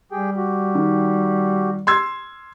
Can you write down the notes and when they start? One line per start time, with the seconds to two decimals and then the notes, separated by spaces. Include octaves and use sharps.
0.12 G3 G4 G#4 G5
0.37 F#4 G4
0.75 D#3
1.87 C6 E6 G#6